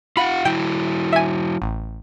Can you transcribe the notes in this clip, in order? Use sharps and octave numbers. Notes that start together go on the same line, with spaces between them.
F4 F5 F#5 B5
F#3 E4 G5
E5 G#5
A1